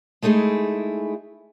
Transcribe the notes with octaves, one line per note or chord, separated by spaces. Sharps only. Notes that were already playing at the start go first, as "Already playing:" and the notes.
G#3 A3 D#4 E4 G#4